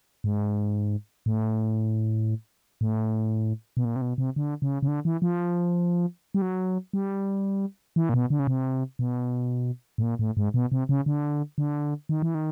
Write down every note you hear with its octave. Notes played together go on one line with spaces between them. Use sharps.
G#2
A2
A2
B2
A#2
C3
B2
C3
D3
C#3
C#3
D3
E3
F3
G3
F#3
G3
E3
A#2
B2
D3
C#3
C3
B2
A2
A#2
A2
G#2
B2
C3
C#3
D3
D3
D#3
E3
D#3